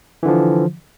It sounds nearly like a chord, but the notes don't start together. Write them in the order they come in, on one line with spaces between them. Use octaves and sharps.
E3 D3 F3